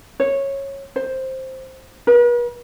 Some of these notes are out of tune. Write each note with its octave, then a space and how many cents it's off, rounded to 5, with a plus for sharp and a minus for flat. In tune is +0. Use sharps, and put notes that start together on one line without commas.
C#5 -15
C5 +5
B4 -45